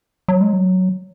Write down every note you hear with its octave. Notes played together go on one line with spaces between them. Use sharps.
F#3
G#3
F#3